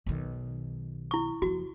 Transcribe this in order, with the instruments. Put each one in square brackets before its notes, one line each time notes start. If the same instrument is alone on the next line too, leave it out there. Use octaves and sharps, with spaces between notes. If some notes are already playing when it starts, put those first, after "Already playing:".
[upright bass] B1 D#3
[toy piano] E4 C#6
[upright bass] F#1 F3 [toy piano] F#4